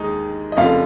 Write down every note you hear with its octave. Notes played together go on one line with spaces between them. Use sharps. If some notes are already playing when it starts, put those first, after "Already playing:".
Already playing: D#2 D#3 G#3 D#4 D#5
D#5
F1 F2 C#3 F4 F5